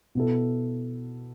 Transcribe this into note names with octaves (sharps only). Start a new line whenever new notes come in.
B2 B3 E4 A4